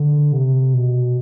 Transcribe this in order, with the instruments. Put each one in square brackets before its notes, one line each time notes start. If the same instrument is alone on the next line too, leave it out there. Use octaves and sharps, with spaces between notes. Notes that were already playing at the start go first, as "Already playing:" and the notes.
Already playing: [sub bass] D3
C3
B2